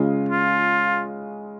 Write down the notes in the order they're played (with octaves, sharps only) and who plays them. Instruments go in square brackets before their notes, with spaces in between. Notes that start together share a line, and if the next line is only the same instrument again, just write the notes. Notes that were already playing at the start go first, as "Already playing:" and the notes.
Already playing: [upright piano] C#3 G#3 C#4 F4
[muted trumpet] F4